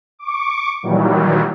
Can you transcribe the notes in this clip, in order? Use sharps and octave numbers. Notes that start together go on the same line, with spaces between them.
C#6 D6
A#2 D#3 E3 F#3 G3